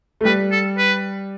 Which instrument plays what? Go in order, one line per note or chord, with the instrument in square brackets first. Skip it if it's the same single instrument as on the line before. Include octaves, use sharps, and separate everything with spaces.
[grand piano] A3
[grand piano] G3 [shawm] B4
[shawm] A4
B4